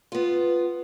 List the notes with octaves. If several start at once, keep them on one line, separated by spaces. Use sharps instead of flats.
B3 F4